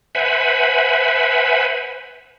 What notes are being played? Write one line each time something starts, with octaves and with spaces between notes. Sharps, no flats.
B4 C5 E5 F#5 G#5 B5